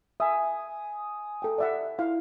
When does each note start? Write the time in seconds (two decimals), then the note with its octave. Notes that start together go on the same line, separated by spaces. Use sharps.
0.20 E5 G#5 D#6
1.42 A4 G5
1.58 D5 E5 F#5
1.99 E4 F5